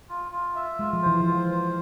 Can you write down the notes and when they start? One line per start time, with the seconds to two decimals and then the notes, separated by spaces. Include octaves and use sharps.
0.09 F4
0.32 F4
0.55 E5
0.79 G#3 F4
0.93 F3
1.03 E3 C5
1.20 F3
1.27 F4
1.51 C5